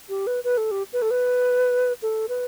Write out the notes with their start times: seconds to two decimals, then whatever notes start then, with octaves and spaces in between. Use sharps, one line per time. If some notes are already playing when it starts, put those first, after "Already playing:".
0.09 G4
0.27 B4
0.44 B4
0.57 A4
0.71 G4
0.93 B4
1.02 A4
1.11 B4
2.02 A4
2.29 B4